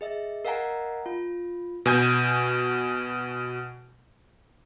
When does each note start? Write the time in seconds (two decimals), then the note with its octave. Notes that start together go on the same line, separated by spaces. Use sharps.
0.01 G#4 D#5 E5
0.45 A#4 D#5 F5 F#5 G#5 A#5
1.06 F4
1.86 B2 G#5 G6 D#7